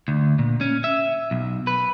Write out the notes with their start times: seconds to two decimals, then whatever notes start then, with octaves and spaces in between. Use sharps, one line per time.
0.08 D2
0.39 A#2
0.61 C#4
0.84 E5
1.31 B1
1.67 B4